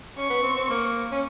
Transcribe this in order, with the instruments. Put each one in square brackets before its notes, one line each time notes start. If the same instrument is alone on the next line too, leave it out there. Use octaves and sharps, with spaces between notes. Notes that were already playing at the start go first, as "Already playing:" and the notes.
[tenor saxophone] C#4 [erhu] C#6
[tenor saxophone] B3
C4
C4
A#3
C#4